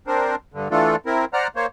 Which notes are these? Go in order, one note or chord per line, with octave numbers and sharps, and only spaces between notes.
C4 D4 A#4 C5
G2 D3
E3 A3 D4 F4 A4
C4 E4 A#4
C5 D5 F#5 A#5 F6
A#3 C5 C#5